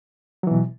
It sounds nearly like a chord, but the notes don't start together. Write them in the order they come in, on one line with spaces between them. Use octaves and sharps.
F#3 E3 B2